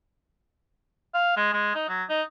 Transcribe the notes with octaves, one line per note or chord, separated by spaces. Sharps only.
F5
G#3
G#3
D#4
F#3
D#4